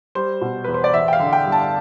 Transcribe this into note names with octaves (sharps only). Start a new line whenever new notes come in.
G3 C5
B2
E2 B4
C5
D5
A1 E5
G5
F5
D3
G5
G2
A5